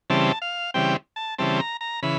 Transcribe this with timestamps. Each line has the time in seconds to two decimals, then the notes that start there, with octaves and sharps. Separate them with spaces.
0.10 C#3 E3 G3 C4 A5
0.42 F5
0.74 C#3 E3 G3 C4 G5
1.16 A5
1.38 C#3 E3 G3 C4 A5
1.60 A#5
1.81 A#5
2.03 C#3 E3 B5